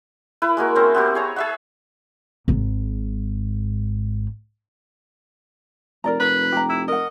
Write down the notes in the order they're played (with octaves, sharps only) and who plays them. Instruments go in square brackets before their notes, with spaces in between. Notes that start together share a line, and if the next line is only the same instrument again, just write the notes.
[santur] E4 B4
G#3 A#3 F#4 A#4
C4 C#4
B3 C4 G4
G#4 C#5 A#5
G#4 E5 F#5
[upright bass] G#1 G#2
[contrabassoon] F1 [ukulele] A#4 D5 A#5
[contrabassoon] F1 [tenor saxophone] B4
[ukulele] G4 A#5
[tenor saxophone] E4
[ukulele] A#4 F#5 [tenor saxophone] D#5